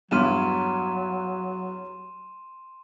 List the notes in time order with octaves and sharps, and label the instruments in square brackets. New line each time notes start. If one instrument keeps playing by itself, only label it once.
[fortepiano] E2 G2 F6 [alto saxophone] F#3 [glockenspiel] C6 D#7 E7